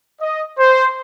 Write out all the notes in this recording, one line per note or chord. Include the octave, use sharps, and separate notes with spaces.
D#5
C5